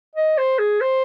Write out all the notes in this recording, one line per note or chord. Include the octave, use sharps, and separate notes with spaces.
D#5
C5
G#4
C5